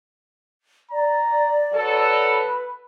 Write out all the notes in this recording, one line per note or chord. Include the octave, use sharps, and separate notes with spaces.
D5 A#5
F#3 A4 B4